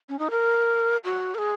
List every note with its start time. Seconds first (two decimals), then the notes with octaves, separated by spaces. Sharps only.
0.09 C#4
0.19 D#4
0.31 A#4
1.04 F#4
1.35 A#4
1.38 G#4